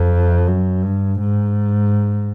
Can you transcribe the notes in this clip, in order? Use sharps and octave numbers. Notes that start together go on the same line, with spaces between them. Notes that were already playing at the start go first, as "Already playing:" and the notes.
Already playing: F2
F#2
G2
G#2